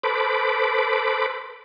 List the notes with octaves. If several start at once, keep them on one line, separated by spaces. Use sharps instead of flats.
A4 B4 C5 B5 D6